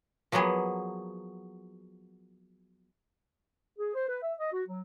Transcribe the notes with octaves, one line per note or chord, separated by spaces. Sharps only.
F3 F#3 A#3 B3 G#4
G#4
C5
B4
E5
D#5
F#4
F#3